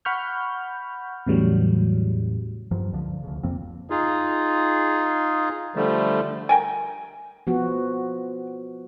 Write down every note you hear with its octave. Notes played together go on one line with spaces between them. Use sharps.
F#5 B5 C#6 F6 G6
E2 A2 C#3 E3 F#3 G3
G2 F3 F#3
C#2 D3 E3 F3
D2 C#3
F2 F3 A#3 C4
D#4 F4 G#4
D3 F3 G3 A3
A#4 G5 G#5
F3 B3 F#4